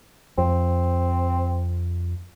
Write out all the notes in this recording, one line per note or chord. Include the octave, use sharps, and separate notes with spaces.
F2 C4